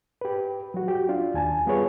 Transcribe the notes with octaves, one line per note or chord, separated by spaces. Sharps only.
G4 B4
F#3 F#4
F#4 G4
D4 F4
D#2 G#5 A5
G3 B3 F4 G#4 B4 C#5